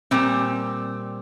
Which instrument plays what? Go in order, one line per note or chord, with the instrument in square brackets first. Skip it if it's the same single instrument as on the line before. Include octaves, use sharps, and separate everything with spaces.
[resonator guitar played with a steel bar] A#2 G3 C4